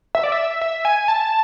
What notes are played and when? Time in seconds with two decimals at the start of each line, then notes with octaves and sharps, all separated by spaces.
0.15 E5
0.24 D5
0.32 E5
0.61 E5
0.85 G#5
1.08 A5